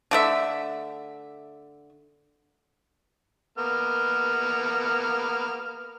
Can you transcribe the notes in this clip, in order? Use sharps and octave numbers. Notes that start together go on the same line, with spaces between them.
D3 A3 E5
A#3 B3 F6